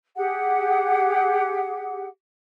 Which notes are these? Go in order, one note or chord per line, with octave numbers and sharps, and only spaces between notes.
G4 G#4 F#5